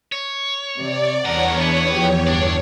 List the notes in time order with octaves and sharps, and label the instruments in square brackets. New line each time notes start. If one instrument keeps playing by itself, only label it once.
[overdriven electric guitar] C#5
[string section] C3 [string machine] D5
[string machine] E2 C#5 [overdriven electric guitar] G2 A#4 [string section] F#5
[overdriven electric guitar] B3 [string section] D4
[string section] F3 G4
[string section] G1 [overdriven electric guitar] D4 D5